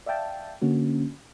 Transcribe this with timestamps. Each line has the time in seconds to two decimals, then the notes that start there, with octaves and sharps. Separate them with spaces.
0.06 D5 E5 F5 G5 A5
0.62 D3 A#3 C#4 F#4